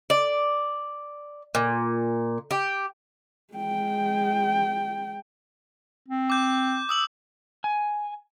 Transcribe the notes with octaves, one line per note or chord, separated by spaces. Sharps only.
D5
A#2
G4
G#3 G5
C4
D6 G6
D#6 E6 F#7
G#5